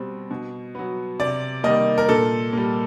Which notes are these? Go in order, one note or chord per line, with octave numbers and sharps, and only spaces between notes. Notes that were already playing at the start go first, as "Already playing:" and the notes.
Already playing: B2 G3 C4
B2
F#3 B3
C3 D5
D#3 G3 A#3 D#5
A#4
A#2 A4
G3 A#3